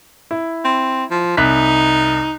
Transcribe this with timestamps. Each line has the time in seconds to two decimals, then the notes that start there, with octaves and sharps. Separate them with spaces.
0.31 E4
0.65 C4
1.11 F3
1.37 C2 D#4 F#6 B6